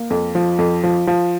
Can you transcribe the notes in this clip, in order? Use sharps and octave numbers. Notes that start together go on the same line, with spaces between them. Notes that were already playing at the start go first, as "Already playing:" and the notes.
Already playing: A#3
F2
F3
F2
F3
F3